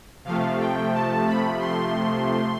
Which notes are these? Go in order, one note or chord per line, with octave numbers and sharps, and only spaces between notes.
C3 F3 A3 F5
G5
A5
B5
C6